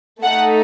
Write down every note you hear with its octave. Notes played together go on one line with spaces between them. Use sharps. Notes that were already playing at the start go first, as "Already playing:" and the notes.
A3 D#4 A4 F#5